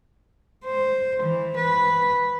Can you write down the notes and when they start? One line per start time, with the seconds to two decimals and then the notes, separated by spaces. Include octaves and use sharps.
0.65 C5
1.22 E3
1.56 B4